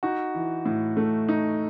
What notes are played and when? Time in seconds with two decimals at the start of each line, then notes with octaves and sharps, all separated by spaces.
0.03 D#4 F#4
0.35 E3
0.66 A2
0.97 A3
1.29 D#4